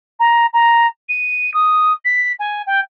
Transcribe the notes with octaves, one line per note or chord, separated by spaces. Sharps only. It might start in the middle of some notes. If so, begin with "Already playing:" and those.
A#5
A#5
D#7
D#6
B6
G#5
G5